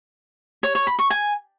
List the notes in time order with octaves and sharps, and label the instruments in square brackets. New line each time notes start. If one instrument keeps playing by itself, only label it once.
[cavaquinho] C#5
C#5
B5
C#6
G#5